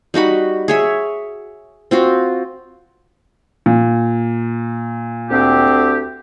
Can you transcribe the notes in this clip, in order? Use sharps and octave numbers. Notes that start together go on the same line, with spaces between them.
G3 D#4 F#4 B5
G#4 C#5 E5
C4 F4 F#4
A#2
D2 C4 G4